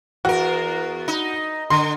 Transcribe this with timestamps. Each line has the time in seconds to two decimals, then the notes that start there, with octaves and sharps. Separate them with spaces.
0.25 E2 F#4 A#4
1.08 D#4
1.70 D3 C6